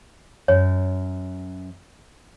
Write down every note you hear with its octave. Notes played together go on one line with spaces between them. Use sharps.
F#2 C#5